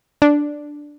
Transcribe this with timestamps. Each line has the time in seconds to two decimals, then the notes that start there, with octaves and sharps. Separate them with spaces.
0.22 D4